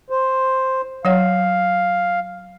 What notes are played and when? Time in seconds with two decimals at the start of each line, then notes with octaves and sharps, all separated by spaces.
0.10 C5
1.05 F#3 C#5 F5 F#5